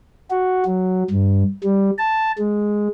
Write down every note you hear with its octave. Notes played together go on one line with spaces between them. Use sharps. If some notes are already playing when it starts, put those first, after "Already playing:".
F#4
F#3
G2
G3
A5
G#3